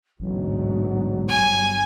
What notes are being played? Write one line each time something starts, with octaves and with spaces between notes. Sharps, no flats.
A1 D2 G#2 B2 F#3
G1 G2 G#5